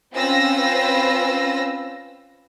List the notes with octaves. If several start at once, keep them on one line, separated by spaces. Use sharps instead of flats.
C4 C#4 F4 B4 E6 A#6